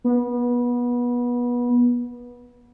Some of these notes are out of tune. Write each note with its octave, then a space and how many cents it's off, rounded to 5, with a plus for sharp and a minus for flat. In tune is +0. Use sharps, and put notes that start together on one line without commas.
B3 -25